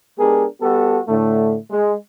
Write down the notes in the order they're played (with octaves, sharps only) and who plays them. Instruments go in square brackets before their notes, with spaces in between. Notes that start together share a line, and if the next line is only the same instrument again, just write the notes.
[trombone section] G#3 B3 D4 G4 G#4 A#4
G3 B3 F#4 G4 A4
A2 D3 A3
G#3